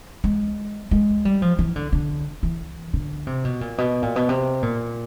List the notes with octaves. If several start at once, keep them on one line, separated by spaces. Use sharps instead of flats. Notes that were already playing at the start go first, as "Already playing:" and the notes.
G#3
G#3
G3
F3
E3
D3
D3
E3
D3
C3
B2
A#2
B2
A#2
B2
C3
A#2